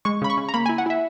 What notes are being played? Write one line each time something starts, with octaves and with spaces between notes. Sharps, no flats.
G#3 C#6
C#3 B5
C#6
C#3
A#5
A#3 B5
G#5
E4
F#5
E4 E5